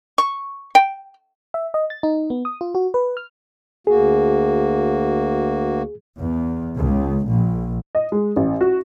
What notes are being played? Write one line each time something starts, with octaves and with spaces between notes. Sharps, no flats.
C#6
G5
E5
D#5
A6
D#4
B3
D#6
F4
F#4
B4
F6
D2 A#3 F#4 G#4
E2
C#2
A#1
D#5
G#3
A1
F#4